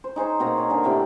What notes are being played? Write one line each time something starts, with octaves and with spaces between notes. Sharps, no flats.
C5
D#4 G#4 C5 C#5
B2 A#3 C4 A#5
A#4 C#5
D3 G#3 G#4 A#4
A2 C3 G5